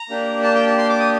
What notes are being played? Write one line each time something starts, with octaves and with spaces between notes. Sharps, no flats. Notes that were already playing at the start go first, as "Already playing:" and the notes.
Already playing: A#5
A#3 D4 G4
A5
G5
A5
C6
D6
D#6